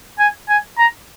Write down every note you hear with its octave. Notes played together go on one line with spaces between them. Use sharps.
G#5
G#5
A#5